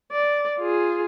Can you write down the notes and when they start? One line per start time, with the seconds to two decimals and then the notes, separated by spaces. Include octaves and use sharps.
0.12 D5
0.59 F4 G#4